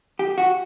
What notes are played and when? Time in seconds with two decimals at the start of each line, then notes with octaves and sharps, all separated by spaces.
0.19 G4
0.38 F#4